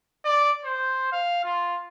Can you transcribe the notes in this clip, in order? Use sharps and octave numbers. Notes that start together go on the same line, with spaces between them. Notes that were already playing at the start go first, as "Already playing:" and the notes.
D5
C5
F5
F4